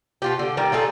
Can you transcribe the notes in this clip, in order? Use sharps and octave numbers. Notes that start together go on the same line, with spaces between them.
B2 F4 G4
D3
D#3 G3
D#4 F4 G#4 A4